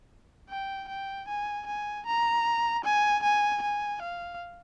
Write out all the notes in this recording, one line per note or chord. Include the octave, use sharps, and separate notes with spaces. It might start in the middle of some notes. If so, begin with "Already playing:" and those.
G5
G5
G#5
G#5
A#5
G#5
G#5
G#5
F5